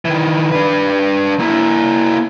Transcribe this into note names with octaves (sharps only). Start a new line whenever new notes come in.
D#3 E3
D4 B4
A#3 E4